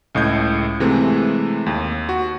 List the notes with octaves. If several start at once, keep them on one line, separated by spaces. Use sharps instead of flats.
C#2 A2 D#5 G6
C3 E3 G#3 A3 C4
D#2
F#4